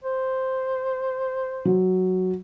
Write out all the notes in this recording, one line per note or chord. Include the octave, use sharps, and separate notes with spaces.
C5
F#3